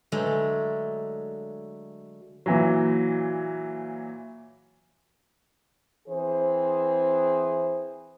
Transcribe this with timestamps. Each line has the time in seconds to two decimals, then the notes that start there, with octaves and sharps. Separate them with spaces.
0.12 D3 F#3 G#3 A3
2.46 A#2 E3 F#3
6.08 E3 C4 G#4 C5